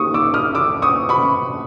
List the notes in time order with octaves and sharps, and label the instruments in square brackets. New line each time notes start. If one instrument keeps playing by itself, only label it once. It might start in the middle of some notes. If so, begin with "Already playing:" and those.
Already playing: [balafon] A#3 D#4 G4 [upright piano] C#6 D#6
[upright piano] D6 E6
D#6 F6
D6 E6
C#6 D#6
B5 C#6